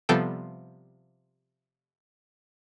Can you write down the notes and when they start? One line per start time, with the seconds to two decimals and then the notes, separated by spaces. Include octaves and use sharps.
0.09 C3 F3 G3 B3 A4 G5